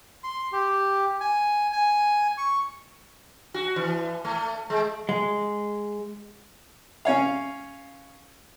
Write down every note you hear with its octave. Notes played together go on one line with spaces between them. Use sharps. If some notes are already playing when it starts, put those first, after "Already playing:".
C6
G4
G#5
G#5
C#6
F#4
E3
A3
G#3
G#3
C#4 C#5 F5